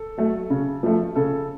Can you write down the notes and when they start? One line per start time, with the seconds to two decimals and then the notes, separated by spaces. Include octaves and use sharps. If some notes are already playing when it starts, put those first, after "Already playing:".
Already playing: A4
0.18 F#3 A3
0.50 C#3
0.83 F3 A3
1.15 C#3 A4